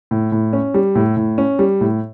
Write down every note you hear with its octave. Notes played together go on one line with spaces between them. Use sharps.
A2
A2
C#4
G3
A2
A2
C#4
G3
A2